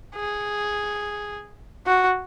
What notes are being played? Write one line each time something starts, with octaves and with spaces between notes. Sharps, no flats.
G#4
F#4